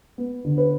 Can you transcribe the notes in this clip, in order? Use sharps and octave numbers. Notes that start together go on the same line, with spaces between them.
B3
D3
B4